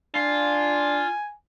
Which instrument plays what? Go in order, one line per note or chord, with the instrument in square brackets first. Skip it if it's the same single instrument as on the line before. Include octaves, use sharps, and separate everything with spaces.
[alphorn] D4 [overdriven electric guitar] F4 [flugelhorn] G#5